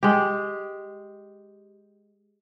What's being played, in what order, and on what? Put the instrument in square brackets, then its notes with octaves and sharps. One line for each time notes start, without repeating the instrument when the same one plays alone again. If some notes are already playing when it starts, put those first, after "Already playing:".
[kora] G#3 G4